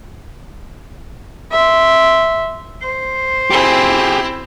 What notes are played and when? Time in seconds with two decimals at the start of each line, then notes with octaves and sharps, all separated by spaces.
1.52 E5 C6
2.81 C5
3.50 C4 E4 G4 G#4